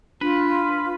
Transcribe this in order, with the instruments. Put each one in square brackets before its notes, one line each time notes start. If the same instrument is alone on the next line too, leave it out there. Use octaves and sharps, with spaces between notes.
[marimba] D4 [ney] F4 [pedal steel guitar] B4